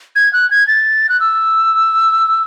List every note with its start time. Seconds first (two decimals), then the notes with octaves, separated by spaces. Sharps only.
0.16 G#6
0.33 F#6
0.51 G#6
0.67 A6
1.09 F#6
1.20 E6